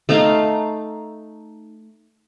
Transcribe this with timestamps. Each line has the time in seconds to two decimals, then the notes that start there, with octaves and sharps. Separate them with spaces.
0.09 A3 D#4 F5 A#5